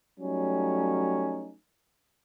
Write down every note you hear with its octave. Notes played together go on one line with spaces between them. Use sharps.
F#3 G3 A3 C#4 D#4